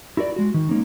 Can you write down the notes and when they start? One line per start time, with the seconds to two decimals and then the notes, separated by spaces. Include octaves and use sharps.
0.17 E4 F#4 A#4 D5
0.36 G#3 F#4
0.54 D#3
0.69 G#3 A#3 C#4 D#4